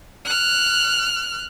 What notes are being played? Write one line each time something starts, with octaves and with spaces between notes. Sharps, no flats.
F6 F#6